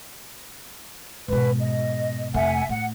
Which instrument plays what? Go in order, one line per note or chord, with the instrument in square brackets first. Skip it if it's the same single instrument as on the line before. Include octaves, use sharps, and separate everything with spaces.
[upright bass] G#2 B2 [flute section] B4
[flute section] D#5
[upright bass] F1 A3 [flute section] E5 F#5 G#5
[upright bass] A2 [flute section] F#5